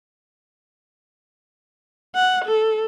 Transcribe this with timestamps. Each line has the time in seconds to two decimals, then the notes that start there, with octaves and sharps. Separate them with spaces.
2.15 F#5
2.45 A4